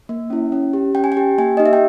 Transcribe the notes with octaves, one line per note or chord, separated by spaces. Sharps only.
A#3
C#4 E4
C#4
G4
C#4 G5
G#5
G5
G4
A#3 G#5
D#4 G4 D#5
E5
G5